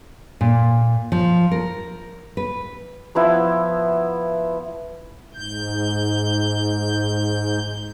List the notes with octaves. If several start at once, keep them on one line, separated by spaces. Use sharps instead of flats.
A#2
F3
A#4
B4
F3 B3 E4
G#2 G6